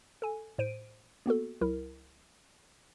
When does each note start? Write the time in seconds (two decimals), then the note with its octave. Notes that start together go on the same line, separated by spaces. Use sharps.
0.22 A4 G#5
0.58 A2 C5 D7 D#7
1.26 A#3 B3 F#4 A4
1.61 C#2 F#3 E4 A#4